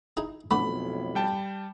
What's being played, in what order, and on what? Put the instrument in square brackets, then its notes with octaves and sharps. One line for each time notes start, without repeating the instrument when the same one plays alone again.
[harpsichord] D#4 E4 G#4
[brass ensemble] B1 F2 A2 [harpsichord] A3 B3 D4 [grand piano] B5
[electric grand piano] G3 G5 A5